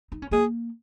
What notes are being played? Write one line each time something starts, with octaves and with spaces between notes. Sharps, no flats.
D#4
C#4
A#3 G#4